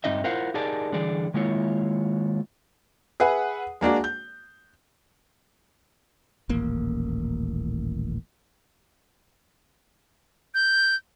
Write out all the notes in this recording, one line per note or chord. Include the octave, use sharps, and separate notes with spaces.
G2 G#3 C4 D#4 D#5 E5
E4 F4 A#4 C5 F5 F#5
D#4 G4 G#4 A#4 D5 A5
D3 E3 G3 G#4 D5
D#3 G#3 A#3 E4 F4 C#5
G#4 B4 E5 F#5
G#3 A#3 D4 F#4
G6
D#1 A1 A#3
G6